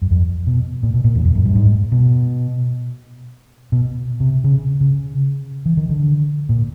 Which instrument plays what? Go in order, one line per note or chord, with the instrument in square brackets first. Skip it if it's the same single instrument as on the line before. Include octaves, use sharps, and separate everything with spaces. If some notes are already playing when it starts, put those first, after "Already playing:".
[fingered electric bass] F#2
F2
B2
A#2
B2
A#2
E2
F2
F#2
G2
G#2
B2
B2
C3
C#3
C#3
E3
D#3
D3
A#2